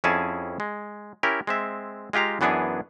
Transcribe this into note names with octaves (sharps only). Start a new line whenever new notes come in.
F2 C#4 E4 G#4 G#5 A5
G#3
C#4 E4 G4 A#4
G#3 C4 E5
G#3 F4 G4 F5 A#5
F#2 E3 B3 D4 G#4 G#5